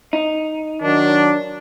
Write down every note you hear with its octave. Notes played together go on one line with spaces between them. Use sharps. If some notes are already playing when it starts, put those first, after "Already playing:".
D#4
D#3 F#3 D4